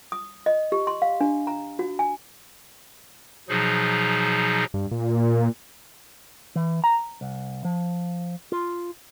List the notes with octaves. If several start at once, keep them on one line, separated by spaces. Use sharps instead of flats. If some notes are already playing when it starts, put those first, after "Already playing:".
D#6
D#5
G4
C6
F5
D4
A#5
F#4
G#5
B2 F3 F#3 D#4 G#4
G2
A#2
E3
A#5
C2
F3
F4